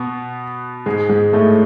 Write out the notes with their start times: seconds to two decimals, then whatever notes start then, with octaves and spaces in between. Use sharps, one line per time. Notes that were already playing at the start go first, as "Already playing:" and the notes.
Already playing: B2 B3
0.86 G#2 G#3
1.09 G#2 G#3
1.33 A2 A3